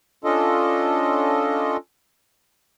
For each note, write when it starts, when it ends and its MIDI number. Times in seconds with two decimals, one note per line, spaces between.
0.24 1.77 61
0.24 1.77 62
0.24 1.77 65
0.24 1.77 69
0.24 1.77 75